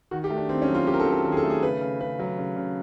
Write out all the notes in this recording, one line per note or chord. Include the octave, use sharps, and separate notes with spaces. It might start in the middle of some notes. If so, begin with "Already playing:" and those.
D#3 F#4
G4
A3
D4
D#3 C4
C#4
F#3
F4
D#3 G4
A#4
A4
F#3
A4
D#3 A#4
G#4
A4
A3
G#4
C#3 B4
C#3
C#3 B4
F#3
C#3
C#3